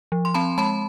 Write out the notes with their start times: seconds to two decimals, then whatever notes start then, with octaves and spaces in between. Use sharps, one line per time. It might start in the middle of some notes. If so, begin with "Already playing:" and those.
0.12 F3
0.25 C6
0.34 C4 A5 B5
0.58 G#3 A5 B5